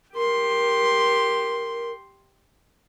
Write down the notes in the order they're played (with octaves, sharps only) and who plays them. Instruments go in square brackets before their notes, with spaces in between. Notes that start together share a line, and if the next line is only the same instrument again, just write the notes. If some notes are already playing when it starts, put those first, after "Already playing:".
[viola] G4 C6 [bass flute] A#4